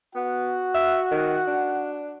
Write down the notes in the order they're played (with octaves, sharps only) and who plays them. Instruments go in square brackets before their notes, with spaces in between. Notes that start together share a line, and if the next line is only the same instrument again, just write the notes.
[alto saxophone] B3 [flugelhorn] F#4 [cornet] F#5
[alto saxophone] E5
D#3
D4